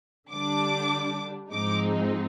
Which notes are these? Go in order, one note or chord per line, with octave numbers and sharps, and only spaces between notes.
D3 G3 D4 D6
G#2 F3 G#3 C4 D#4 D6